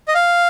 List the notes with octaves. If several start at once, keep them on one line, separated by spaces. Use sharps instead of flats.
D#5
F5